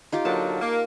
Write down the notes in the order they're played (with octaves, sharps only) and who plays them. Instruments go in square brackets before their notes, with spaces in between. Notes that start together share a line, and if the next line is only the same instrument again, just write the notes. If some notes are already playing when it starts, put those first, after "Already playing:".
[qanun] D#4 F4 G4
[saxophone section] D3 F#3 A#3 [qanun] A5
[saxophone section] A#3